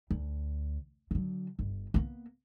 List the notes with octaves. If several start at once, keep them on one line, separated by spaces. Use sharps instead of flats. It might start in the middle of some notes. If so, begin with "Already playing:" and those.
D2
D3 F#3
G1
A#3 B3